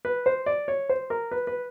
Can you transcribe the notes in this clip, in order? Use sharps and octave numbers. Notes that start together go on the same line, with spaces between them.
B4
C5
D5
C#5
C5
A#4
B4
B4